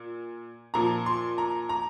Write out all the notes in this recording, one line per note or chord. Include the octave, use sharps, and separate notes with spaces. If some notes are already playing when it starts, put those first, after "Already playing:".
Already playing: A#2
A#2 F3 A#5
C6
A#5
A#5